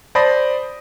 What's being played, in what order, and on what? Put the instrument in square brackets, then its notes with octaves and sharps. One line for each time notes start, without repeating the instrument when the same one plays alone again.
[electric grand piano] C5 D5 A5 B5 D#6 A#6